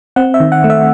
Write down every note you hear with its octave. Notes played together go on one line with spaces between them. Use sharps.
C4 F#5
E5
D#3
F#5
A3
E5